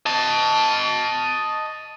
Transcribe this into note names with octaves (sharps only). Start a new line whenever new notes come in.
D#5 A5